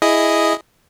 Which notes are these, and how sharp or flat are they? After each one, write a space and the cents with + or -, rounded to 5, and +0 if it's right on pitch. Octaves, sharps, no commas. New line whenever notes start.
E4 +0 G#4 +0 D#5 +0